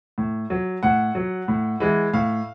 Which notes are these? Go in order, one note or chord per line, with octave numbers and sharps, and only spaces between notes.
A2
F#3
A2 F#5
F#3
A2
E3 G#3
A2 F5